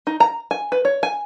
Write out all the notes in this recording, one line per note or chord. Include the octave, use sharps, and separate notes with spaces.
D#4
A#5
G#5
B4
C#5
G#5